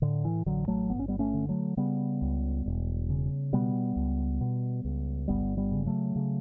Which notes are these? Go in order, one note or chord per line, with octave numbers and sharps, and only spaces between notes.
A2 D3
E3
A1 D3 F#3
F#3 A3
G1 B3
C#4
G3 B3
A3 C#4
D3
F#3 A3
C#3 G3 B3
C#2
E1
C#3
B2 G3 B3
C#2
B2
C#2
G1 G3 B3
G3 B3
C#3
F#3 A3
C#3